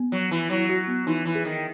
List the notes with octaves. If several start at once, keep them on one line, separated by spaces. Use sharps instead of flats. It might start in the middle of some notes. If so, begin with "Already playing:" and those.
Already playing: B3
F#3
E3
F#3 E4
F#4
B3
E3 D#4
E3
G#4
D#3